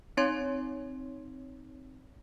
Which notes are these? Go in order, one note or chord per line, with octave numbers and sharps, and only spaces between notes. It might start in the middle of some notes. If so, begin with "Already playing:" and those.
C4 D#4 C#5 C6 G#6